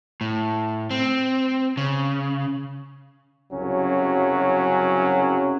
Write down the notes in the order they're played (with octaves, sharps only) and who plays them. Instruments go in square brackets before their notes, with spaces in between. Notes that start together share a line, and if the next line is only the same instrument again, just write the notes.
[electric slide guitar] A2
C4
C#3
[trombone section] C2 F#2 C#3 F#3 C#4